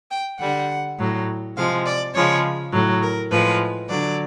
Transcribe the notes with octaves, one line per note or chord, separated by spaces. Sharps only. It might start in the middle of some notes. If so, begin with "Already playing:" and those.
G5
D3 G3 F#5
A2 F#3
C3 F3 G#3 F5
D5
C#3 F3 G#3 C#5
A2 F#3
A#4
A2 F3 G#3 B4
D3 F#3 D5